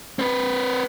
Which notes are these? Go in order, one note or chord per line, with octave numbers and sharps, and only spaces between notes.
C4 B4